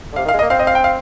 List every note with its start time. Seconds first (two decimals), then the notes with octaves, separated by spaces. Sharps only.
0.13 D3
0.16 C3 F5
0.25 D#3
0.29 F5
0.34 G#3
0.39 D#5
0.42 A#3
0.50 C4 F5
0.59 D#5
0.67 F5
0.75 G5
0.84 F5